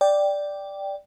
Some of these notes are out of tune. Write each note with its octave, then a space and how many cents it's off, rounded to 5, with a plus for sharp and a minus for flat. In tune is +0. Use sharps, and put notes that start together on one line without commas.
D5 +0 G5 +0